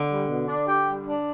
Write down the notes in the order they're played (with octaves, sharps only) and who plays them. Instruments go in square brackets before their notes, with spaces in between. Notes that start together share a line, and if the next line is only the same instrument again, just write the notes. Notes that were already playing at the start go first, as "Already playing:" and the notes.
Already playing: [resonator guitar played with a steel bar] D3
[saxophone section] G3
B2
D4
G4
G3
D4